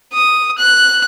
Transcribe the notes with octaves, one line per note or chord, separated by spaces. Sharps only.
D#6
F#6